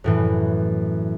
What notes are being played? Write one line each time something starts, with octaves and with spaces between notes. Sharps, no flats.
F#2 A2 E3